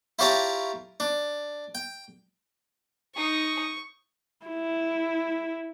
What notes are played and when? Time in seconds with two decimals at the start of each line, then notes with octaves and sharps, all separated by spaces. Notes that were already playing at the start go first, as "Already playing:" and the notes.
0.19 E4 F4 G4 C#5 A5 A#5
1.00 D4
1.75 G5
3.16 D#4 C#6 D#6
4.47 E4